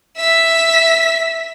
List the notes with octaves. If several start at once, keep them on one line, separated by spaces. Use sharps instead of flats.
E5 B6